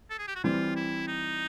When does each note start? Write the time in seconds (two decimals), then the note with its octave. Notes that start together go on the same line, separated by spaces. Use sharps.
0.10 A4
0.19 G#4
0.27 G4
0.35 F#4
0.44 E3 G3 C4 F4
0.76 E4
1.07 D#4